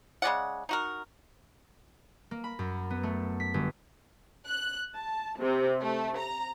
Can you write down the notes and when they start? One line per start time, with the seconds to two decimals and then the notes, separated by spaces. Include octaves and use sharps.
0.22 C#3 G#3 D5 F#5
0.69 D#4 F#4 A#4
2.31 A#3
2.44 B5
2.59 F#2
2.90 B3
3.03 A3
3.40 B6
3.54 G1
4.47 F#6
4.95 A5
5.38 C3
5.81 A3
6.18 A#5